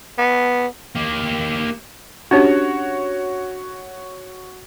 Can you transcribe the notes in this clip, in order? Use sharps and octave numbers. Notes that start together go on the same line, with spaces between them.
B3
A#3 G4
C#4 D4 F#4 G4 C#5